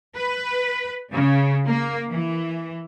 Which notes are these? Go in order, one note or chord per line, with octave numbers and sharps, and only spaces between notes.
B4
C#3
A#3
E3